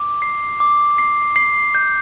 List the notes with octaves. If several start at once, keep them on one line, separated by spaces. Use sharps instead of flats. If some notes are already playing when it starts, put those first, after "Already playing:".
Already playing: D6
C7
D6
C7
C7
G6